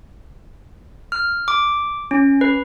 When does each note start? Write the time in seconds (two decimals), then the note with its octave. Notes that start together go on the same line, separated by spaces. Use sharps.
1.12 F6
1.48 D6
2.11 C#4
2.41 B4